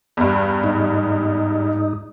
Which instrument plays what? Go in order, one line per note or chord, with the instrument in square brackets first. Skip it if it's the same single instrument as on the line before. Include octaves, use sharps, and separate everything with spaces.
[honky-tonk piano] E2 G2
[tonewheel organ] G#2 D#4